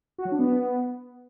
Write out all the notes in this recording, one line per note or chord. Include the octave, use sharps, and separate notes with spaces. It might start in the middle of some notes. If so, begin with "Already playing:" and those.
F#4
F#3
D4
B3